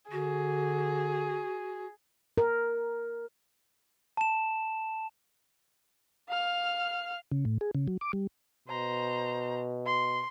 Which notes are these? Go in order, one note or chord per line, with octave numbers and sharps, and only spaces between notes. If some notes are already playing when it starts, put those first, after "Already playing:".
D3 F#4 G#4
A#4
A5 E7
F5 F6
C#3
A2
G#4
C#3
F#3
D6
G3
B2 C5 A#5
C6